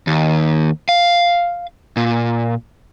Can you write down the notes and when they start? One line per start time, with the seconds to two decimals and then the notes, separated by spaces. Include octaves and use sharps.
0.07 D#2
0.89 F5
1.97 A#2